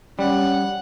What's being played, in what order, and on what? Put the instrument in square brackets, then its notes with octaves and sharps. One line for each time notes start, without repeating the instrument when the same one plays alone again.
[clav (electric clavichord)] G3 [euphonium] C#4 [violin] F#5